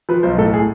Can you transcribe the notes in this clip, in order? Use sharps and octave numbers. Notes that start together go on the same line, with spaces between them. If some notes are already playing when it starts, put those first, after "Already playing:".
F3 B4
B1 C5
A2 A4
G#4